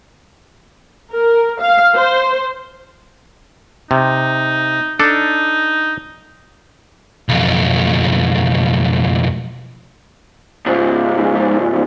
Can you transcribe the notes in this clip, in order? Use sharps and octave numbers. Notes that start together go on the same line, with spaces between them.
A#4
F5
C5
C3 D#4
D4 D#4 A4 D5
B1 F2
C#2 G#2